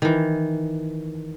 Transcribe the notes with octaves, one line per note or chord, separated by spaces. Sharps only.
D#3 E3